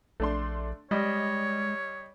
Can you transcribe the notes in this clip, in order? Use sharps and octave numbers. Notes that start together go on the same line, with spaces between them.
A#1 A3 D4 C6
G3 G#3 C#5 D#5